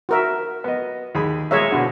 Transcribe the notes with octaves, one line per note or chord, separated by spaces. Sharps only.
F#4 A#4 E5
B3 D#5
D#2 G#4 B5
G#3 A#3 G#4 C#5 E5
B2 D3 F#4